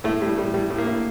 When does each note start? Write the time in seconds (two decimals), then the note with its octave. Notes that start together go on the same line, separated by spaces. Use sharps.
0.04 A2 A3
0.22 A2 G3
0.38 A2 G3
0.54 A2 G3
0.70 A2
0.78 A#3
0.87 A2